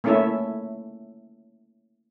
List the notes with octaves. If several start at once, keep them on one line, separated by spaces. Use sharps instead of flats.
A3 A#3 C#4 E4 A4 E5